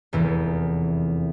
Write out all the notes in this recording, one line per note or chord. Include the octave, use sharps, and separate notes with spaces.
F1 E2 E3